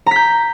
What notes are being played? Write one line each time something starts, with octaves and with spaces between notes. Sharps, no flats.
A#5 G6 B6